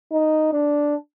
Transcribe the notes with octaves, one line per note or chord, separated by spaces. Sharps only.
D#4
D4